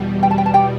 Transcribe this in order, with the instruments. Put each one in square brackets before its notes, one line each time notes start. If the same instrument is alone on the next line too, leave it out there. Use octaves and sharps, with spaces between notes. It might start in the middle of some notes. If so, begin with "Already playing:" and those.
Already playing: [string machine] E2 B2 G3
[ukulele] G5
A5
G5
A5
G4 G5